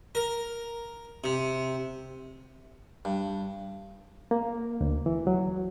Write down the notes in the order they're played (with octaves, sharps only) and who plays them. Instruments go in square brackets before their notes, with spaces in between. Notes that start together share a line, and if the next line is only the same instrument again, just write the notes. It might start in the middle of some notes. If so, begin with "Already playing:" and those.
[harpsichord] A#4
C3
G2
[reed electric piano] A#3
D2
E3
F#3